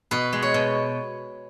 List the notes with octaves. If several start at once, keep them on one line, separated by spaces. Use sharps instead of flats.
B2 B4
G#3
C#5
B2